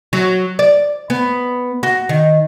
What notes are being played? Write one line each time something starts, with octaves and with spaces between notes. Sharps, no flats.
F#3
D5
B3
F#4
D#3